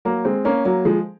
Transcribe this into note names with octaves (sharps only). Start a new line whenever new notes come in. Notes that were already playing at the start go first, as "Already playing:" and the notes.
F#3 A#3
G#3 C4
A#3 C#4
F#3 A#3
F3 G#3